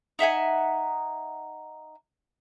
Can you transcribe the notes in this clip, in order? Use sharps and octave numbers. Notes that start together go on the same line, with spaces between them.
D#4 E5 F#5 G#5